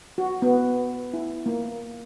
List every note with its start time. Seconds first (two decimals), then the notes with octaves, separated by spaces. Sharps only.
0.18 F#4
0.42 B3
1.14 E4
1.46 A#3